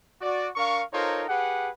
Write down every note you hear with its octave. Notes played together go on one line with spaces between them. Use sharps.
F#4 D5
D4 A#4 F5 C#6
D#4 F4 A4 A#4 C5 C#5
G4 G#4 B4 F#5